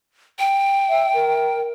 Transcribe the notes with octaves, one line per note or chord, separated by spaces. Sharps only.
G5
E5
A#4